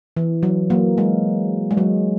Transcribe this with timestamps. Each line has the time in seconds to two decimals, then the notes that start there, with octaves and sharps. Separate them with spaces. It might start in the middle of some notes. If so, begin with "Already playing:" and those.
0.17 E3
0.43 F#3
0.70 F#3 A#3
0.98 G#3
1.71 G#3
1.77 F#3